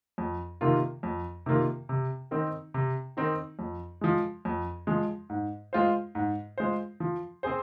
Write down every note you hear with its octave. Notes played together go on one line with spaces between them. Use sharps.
F2
C3 D#3 A#3 F4
F2
C3 D#3 A#3 F4
C3
D#3 C4 D#4 A#4
C3
D#3 C4 D#4 A#4
F2
F3 G#3
F2
F3 G#3
G#2
G#3 F4 C5
G#2
G#3 F4 C5
F3
C4 G#4 C5